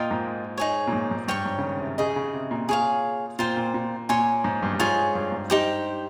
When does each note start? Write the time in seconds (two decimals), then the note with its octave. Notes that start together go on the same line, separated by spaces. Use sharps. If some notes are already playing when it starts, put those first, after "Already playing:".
Already playing: A#2 F4 A#4 D#5 G5
0.11 G#2
0.58 D#4 G#4 C#5
0.87 A#2
0.92 G#2
1.11 G#2
1.28 G2 C#5 G5 C#6
1.46 G#2
1.58 C#3
1.63 D#3
1.80 C3
1.98 C#3 D#4 G#4 D#5
2.16 C#3
2.34 C3
2.51 A#2
2.69 A#2 G#4 C#5 F5
3.39 A#2 F4 C5 G5
3.57 A#2
3.74 A#2
4.09 A#2 C#5 G#5 C6
4.44 G#2
4.62 G2
4.73 G2
4.79 G#2 F4 G#4 C#5 G#5
5.15 G2
5.32 G#2
5.50 G2 D#4 G4 C5